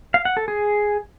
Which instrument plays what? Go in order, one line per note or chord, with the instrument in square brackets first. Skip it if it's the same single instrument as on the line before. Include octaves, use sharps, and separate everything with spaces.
[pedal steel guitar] F5
F#5
A4
G#4